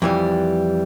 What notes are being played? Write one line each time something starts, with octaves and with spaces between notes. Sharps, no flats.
F2 E3 G3